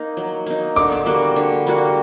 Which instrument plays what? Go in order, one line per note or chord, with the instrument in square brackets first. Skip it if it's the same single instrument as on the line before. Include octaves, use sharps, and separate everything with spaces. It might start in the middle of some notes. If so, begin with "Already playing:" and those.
Already playing: [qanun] A#3 D#4
F#3
A#3 D#4
[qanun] D3 [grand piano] D6
[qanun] G3 A#3 F#4
D3
G3 A#3 F#4